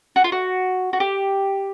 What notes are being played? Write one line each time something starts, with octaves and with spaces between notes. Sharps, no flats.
F#4
F4
F#4
F#4
G4